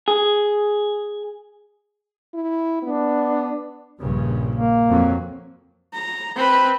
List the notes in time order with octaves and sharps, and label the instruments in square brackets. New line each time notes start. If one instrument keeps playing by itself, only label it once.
[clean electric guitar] G#4
[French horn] E4
[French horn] B3 [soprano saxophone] D4
[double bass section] A#1 G2 C#3
[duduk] A#3
[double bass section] F2 F#3
[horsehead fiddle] A#5
C4 B4